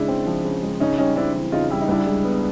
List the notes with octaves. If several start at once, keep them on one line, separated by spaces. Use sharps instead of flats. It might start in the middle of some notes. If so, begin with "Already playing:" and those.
Already playing: C#3 G#3 D4 E4
C4
F3
C#3
G#3
C#3 C#4 D#4
G3 C#4 D#4
C4 D4 E4
E3
C#3 D#4 F4
G3 E4
D#4
C2 D4 E4
G#3
B3